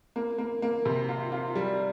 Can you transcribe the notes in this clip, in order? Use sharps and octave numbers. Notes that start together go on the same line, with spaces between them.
A#3
A#3
A#3
C3
F4
F4
G3